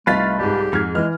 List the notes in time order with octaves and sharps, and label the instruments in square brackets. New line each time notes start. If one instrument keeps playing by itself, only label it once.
[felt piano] C2 D#4 [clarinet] A3 [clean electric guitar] F4 B4 [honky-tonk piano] F5 A6 B6
[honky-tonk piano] G#2 G3 [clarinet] G4
[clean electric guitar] F2 [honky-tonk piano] G#2 [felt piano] F6 G#6
[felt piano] E3 [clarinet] G#3 [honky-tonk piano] F6